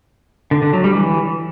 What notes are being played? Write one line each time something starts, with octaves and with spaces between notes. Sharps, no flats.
D3
D3
F#3
G3
E3